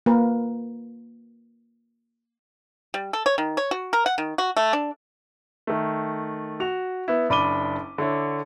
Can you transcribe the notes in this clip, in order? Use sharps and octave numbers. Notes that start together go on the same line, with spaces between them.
A#3 A#4 B4
G3
A4
C#5
D#3
C#5
F#4
A#4
F#5
D#3
F#4
A3
D4
D#3 A3
F#4 F7
B3 E4
F#1 D4 B5 D6 D#7 G7
D3 E4 C#5